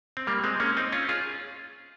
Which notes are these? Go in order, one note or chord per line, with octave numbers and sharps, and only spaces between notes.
C4
G3 A#3
G#3 C4
A#3 C#4
C4 D#4
C#4 F4
F4 G#4